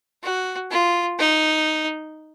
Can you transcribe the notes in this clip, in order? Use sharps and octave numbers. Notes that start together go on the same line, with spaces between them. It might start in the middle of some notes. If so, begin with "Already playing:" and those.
F#4
F4
D#4